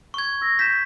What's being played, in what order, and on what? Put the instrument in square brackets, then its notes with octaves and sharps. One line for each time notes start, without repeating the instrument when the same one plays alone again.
[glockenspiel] C#6 G#6
[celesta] E6 A#6
[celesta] G6 E7 [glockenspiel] B6